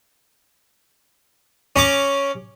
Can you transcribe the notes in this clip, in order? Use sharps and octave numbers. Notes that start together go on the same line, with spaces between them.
C#4 A#5 D6